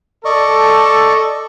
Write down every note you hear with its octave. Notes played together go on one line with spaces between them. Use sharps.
A4 D5 D#5 C#6